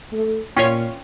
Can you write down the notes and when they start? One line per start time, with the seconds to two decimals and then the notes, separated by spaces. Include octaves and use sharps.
0.12 A3
0.57 A#2 C#4 F4 C#5 G5